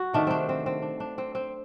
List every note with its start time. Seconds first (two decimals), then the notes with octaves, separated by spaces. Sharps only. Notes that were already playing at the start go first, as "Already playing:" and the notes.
Already playing: F#4
0.13 C3 D#3 A3 D4
0.27 C4 D4
0.49 C4
0.66 C4
0.82 D4
1.00 D4
1.18 C4
1.35 C4